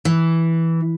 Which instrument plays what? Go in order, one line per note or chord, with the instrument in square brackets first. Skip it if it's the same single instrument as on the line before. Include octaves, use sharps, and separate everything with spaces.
[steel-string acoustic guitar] E3